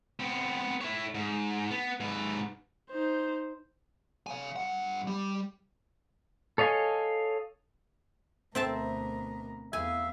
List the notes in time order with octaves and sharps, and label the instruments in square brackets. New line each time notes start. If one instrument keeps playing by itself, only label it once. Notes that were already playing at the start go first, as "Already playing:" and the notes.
[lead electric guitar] B3 C4
E4 C#5
G#2
B3
G#2 B4
[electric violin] D#4 C5
[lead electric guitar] F5 G#5
G2 F#5
G3
[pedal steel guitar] A4 C#5 D#5 F5 G#5
[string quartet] D2 B2 A#4 [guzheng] C4 E5 A5
[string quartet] E2 F5 [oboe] E5 [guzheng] G#5